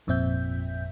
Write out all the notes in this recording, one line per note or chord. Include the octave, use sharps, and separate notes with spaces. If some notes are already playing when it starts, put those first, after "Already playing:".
G#1 F2 A#2 C4 E5 G6